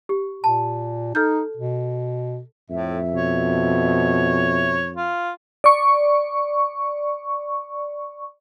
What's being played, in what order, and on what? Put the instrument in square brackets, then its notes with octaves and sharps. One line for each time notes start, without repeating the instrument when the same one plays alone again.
[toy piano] G4
[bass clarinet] A#2 [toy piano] A5
[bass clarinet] D#4 [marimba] A4 F6 G6
[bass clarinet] B2
[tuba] F2 [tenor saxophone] A2 [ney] E5
[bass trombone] B2 [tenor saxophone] C#5
[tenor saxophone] F4
[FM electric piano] D5 C#6